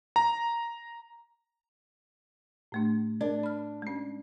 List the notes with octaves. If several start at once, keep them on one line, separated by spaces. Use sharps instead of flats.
A#5
A2 A3 D4
D4 A#4
B5 F6
G#3 C#4